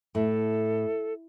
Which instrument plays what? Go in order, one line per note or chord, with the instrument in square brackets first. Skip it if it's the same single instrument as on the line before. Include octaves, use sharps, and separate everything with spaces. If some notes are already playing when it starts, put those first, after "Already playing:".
[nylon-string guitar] A2 [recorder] A4